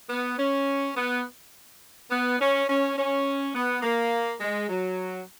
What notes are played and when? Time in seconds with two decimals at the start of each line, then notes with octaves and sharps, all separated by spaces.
0.09 B3
0.38 C#4
0.95 B3
2.10 B3
2.39 C#4
2.67 C#4
2.96 C#4
3.54 B3
3.82 A#3
4.40 G#3
4.68 F#3